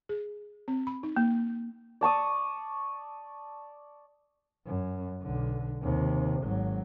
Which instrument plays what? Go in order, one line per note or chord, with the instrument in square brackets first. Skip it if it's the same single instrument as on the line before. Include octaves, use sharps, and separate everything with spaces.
[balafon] G#4
C4
B5
D#4
A#3
[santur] D5 A5 C#6 D#6
[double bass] F#2
B1 D3
D#2 C3
G#1 F#3